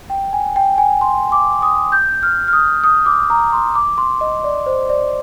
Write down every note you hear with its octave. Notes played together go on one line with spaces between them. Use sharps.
G5
G#5
G5
G#5
C6
D6
D#6
G6
F6
F6
D#6
D#6
D6
A#5
C6
D6
C6
D#5
D5
C5
D5